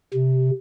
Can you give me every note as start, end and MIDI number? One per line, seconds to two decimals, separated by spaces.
0.14 0.51 48